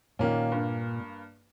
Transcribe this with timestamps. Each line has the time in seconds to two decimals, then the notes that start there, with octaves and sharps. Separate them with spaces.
0.19 A#2 D#3 A#3 C#4
0.52 G2 A#3